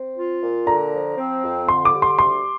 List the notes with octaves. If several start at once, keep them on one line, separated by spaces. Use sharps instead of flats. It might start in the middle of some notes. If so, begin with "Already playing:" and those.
Already playing: C4
F4
A#2
D3 A#5
F3
C4
F2
D3 C6
D6
G3
C6
D2 C6